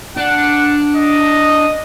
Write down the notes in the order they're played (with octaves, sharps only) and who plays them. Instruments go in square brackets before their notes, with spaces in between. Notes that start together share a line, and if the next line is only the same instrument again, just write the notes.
[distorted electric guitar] D4 [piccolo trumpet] F#5
[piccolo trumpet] D#5